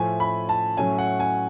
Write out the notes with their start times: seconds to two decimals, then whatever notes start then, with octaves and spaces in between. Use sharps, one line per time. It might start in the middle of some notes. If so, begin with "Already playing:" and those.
Already playing: A2 F3 A3 G#5
0.20 B5
0.49 A5
0.77 A2 F#3 A3 C#4 G#5
0.98 F#5
1.20 G#5